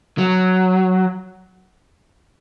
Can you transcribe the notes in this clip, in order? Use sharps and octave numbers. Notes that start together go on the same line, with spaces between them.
F#3